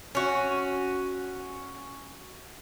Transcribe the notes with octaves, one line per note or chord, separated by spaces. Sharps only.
C#4 F#4